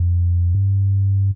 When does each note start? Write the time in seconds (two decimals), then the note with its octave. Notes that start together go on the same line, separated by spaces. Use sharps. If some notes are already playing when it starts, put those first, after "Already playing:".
Already playing: F2
0.55 G2